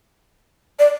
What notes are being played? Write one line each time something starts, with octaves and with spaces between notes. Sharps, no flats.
D5